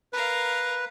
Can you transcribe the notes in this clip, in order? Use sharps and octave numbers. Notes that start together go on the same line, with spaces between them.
A#4 B4 F5